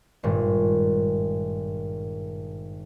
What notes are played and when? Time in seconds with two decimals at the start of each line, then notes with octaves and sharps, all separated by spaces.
0.23 G#1 G2 A#2